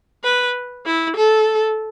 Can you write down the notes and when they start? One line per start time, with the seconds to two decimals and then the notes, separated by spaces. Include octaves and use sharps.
0.23 B4
0.85 E4
1.16 A4